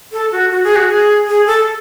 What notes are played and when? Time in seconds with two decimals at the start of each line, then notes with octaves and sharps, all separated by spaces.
0.12 A4
0.32 F#4
0.51 F#4
0.64 G#4
0.76 F#4
0.89 G#4
1.28 G#4
1.47 A4